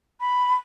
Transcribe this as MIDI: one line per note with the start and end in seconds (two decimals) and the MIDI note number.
0.20 0.53 83